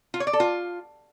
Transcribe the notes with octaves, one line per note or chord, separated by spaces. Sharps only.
F4
C#5
D5
A4
F4